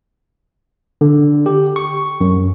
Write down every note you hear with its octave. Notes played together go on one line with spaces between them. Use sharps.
D3
G4
C#6
F#2